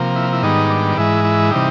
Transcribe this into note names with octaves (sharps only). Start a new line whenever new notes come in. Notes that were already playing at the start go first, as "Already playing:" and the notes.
Already playing: C3 F3 A#3
E4
E4
G#2 D#3 G3 B3 D#4
D4
G#2 E3 G#3 E4
E4
C3 E3 G3 D#4